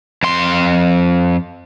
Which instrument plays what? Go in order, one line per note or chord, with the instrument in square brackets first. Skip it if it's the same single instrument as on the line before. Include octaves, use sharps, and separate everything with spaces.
[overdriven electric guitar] F2 C6